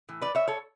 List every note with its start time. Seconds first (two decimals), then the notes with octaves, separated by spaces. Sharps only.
0.09 A2 E3
0.21 B4 D5
0.35 C#5 E5
0.48 A4 C#5